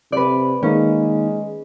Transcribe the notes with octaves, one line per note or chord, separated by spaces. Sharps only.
C3 B4 D5
D#3 G#3 A#3 C#4 D#4